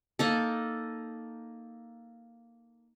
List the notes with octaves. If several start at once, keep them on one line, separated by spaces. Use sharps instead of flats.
A#3 D#4 A4